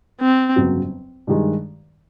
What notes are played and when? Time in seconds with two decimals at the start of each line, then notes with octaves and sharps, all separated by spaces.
0.21 C4
0.56 G1 F2 C#3 F#3
1.27 G2 D#3 G#3